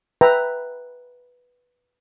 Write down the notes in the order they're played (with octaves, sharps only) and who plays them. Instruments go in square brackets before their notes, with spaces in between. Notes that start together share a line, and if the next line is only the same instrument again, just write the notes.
[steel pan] B4 E5 G5 A#5